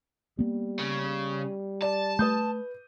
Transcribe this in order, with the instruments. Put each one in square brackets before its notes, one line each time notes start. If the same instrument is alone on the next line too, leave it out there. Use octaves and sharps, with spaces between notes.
[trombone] G3 [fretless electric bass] A#3 B3
[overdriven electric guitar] C#3
[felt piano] D5 [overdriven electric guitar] A5
[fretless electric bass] A3 [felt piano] B4 D#6 G6